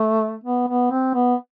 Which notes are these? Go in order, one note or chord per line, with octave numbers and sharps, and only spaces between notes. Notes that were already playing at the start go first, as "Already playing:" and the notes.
Already playing: A3
B3
B3
C4
B3